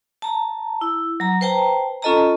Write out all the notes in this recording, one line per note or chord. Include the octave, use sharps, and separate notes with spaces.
A5 A#5
E4
F#3 A#5
B4 C5 G5 A5 A#5
C#4 F4 A4 D#5 A5 A#5